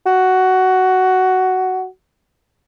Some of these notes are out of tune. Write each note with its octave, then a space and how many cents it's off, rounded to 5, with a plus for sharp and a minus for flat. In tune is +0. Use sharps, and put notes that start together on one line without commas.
F#4 +10